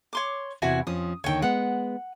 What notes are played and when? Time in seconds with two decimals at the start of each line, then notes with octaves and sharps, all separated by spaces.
0.13 C#5 C6 D6
0.62 E2 C3 E4 F#4 G#5
0.87 F2 F3 C#4 D#6
1.24 D#2 D3 D#3 C#5 G5
1.42 G#3 B3 F#5